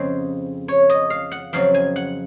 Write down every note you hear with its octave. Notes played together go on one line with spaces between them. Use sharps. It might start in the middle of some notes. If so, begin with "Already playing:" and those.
Already playing: F2 C#3 G#3 C4 C5
C#5
D#5
F5
F#5
F2 C#3 F#3 C4 F5
G#5
F#5